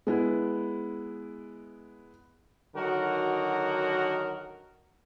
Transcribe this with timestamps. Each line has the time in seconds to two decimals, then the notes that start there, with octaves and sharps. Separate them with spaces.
0.07 G#3 B3 E4
2.75 D3 D#3 F#3 D#4 F#4 A#4